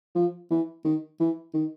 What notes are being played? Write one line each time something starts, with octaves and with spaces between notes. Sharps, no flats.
F3
E3
D#3
E3
D#3